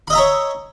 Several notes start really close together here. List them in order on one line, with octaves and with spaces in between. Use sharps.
B5 D#5 E5 A#5 C#5